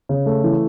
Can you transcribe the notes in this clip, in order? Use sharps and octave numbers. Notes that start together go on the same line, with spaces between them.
C#3
A3
E3